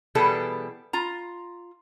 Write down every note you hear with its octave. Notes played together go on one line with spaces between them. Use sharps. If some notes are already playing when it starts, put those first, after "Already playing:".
B2 E3 G3 B3 G#4 A4
F4 A#5